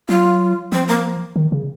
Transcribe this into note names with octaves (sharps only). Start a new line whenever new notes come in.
F#3 F4
F3 C4
A#3
D#3
C#3